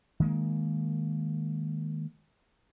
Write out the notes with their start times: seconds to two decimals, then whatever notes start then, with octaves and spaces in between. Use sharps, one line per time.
0.20 D#3 G#3 A#3